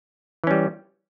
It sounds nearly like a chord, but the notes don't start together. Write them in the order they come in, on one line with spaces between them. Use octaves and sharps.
E3 C#4 G3